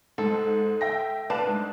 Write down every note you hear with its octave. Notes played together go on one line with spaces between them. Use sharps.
G#2 A4
E5 G5 A#6
D4 B4 F5 A5
G#2